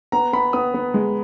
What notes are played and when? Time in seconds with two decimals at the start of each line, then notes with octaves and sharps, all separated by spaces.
0.12 B3 A#5
0.33 B3 B5
0.53 B3 D#6
0.74 B3
0.94 G#3